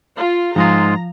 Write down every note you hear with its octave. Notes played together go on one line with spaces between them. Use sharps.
F4
G#2 F3 G#3 F4 A#5